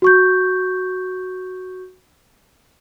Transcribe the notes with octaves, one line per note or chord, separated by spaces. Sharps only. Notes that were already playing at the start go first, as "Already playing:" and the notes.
F#4 C#6 G6